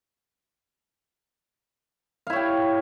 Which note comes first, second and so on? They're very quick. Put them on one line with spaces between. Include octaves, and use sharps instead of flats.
F5 E4 C#5 G4